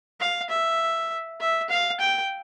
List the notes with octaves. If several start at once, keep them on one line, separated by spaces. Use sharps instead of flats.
F5
E5
E5
F5
G5